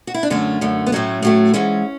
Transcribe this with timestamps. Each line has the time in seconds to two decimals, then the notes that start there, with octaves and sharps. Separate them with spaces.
0.07 F#4
0.14 E4
0.23 D4
0.30 F#2 D3 A3 C#4
0.61 F#2 D3 A3
0.87 B3
0.92 A2 F#3 A3 C#4
1.23 A2 F#3 A3
1.54 G#2 E3 G#3 C#4